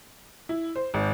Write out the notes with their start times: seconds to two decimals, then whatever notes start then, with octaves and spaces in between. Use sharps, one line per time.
0.49 E4
0.76 C5
0.94 G#1